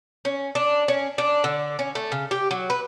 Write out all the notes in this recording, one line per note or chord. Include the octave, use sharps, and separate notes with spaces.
C#4
D4
C#4
D4
D3
C#4
A3
C#3
G4
F#3
B4